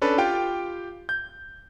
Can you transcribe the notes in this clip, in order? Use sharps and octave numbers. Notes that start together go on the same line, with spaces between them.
C#4 D4 A4 B4
F4 G4 G5
G6